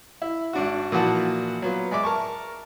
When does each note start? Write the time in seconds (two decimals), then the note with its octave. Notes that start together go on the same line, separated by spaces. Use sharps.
0.22 E4
0.53 G#1 D4 F#4
0.92 A#2 E3 F3 F#4 A5
1.62 F#3 B3 F4
1.91 G#3 D5 E5 D6
2.03 A#4 A5 C#6